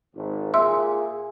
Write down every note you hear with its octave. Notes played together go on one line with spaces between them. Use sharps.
G#1
A#2 G#4 E5 C6 E6